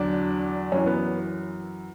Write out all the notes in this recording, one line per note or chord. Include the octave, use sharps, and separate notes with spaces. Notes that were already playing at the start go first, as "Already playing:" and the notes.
Already playing: E2 D3 F#3 D4
F#2 E3 C#4
B3